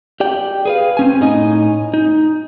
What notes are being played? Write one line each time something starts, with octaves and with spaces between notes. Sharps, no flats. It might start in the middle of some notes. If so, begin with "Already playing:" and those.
G4 D5 G5
G#4 B4 F5
C4 C#4 G#5
A2 D#4 D#5 G#5
D#4